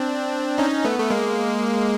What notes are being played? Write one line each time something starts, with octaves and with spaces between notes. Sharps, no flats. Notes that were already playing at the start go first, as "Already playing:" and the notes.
Already playing: C4 D4
C#4 D#4
A3 B3
A3
G#3 A#3